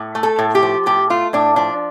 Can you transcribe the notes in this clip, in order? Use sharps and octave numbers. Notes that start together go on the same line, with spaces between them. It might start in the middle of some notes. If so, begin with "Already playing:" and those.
Already playing: A2
A3
A4
A2
G4
F3
A2 G4
A3 F4
A2 D4
F3 D4